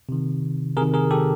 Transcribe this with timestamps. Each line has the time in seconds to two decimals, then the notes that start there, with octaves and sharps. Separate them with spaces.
0.09 C3 D#3
0.77 C3 G#4 A#4
0.81 D#3
0.94 G#4 A#4
1.11 G4 A4